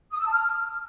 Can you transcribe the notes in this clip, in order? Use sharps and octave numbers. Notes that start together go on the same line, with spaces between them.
D#6
E6
A5
F6